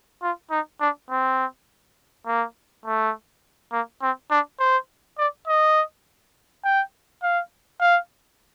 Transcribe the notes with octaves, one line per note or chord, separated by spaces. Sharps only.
F4
D#4
D4
C4
A#3
A3
A#3
C4
D4
C5
D5
D#5
G5
F5
F5